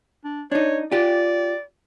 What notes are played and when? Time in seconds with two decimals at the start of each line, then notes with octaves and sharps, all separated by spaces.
0.24 D4
0.52 D4 D#4 C#5
0.92 F4 G4 D5